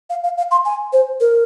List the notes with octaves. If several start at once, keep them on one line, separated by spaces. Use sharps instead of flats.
F5
F5
F5
C6
G#5
C5
A#4